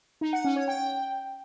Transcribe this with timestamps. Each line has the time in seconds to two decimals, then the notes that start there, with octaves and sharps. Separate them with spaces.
0.21 D#4
0.33 F#5
0.45 C#4
0.56 C#5
0.68 G5